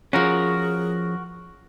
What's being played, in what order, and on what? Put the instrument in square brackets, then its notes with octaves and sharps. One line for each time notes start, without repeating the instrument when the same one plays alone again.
[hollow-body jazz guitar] F3 C#4 [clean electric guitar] F#4 A#4 [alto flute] G#4